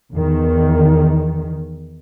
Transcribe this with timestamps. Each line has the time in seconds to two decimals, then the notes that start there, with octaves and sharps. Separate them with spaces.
0.12 E2 D#3